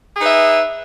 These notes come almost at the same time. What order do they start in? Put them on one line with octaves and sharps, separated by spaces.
G#4 D#4 B4 E5